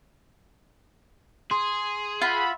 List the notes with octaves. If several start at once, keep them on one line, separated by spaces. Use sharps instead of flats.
G#4 C6
F4 E5 F#5 B5